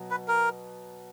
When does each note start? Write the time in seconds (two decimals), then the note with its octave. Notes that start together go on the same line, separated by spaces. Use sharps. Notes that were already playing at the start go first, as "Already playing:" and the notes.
Already playing: B2 F#3
0.11 B4
0.28 A#4